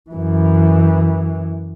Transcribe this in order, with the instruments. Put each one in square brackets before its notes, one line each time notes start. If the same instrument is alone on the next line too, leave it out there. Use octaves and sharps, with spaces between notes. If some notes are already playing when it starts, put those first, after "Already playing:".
[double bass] F#2 E3